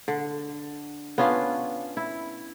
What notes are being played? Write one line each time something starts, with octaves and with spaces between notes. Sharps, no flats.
D3
B3 C#4 D4 F4
E4